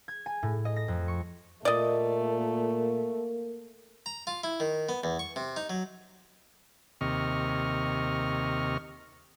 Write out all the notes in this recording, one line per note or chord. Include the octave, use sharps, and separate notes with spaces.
G#6
G#5
A2
D#5
A#6
F2
C#6
A#2 A3 A#3 D5 D#5
A#5
F4
E4
D#3
B3
E2
C#6
C3
D#4
F#3
D#2 C3 D#5 C#6 F6